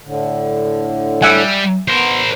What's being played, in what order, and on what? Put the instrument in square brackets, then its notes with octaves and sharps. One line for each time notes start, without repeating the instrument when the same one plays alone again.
[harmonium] A2 D3
[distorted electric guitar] G3 [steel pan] E5 F#5 G#5
[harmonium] B3 [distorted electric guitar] A#4 C5